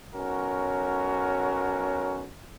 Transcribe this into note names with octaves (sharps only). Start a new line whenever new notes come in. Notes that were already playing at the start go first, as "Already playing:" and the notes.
B1 C#4 F#4 A#4